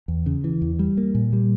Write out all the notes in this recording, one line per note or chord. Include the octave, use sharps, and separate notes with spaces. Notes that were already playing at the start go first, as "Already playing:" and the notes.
E2
C#3
E3
E2
G3
A#3
A#2
G3